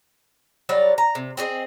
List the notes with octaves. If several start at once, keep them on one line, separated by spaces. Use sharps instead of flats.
F#3 G3 C#5 D5
A#5
C3
C4 G#4 C#5 D#5